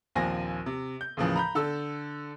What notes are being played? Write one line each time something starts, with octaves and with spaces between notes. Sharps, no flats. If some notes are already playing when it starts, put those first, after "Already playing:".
A#1 D#2 F3 C4 G#5 A#6
C3
G6
D#2 A2 C#3 E3 F3
A#5 B5 G6
D3 A4 E6